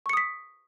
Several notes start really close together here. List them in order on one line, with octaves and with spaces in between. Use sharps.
C#6 C#7 D#6 B6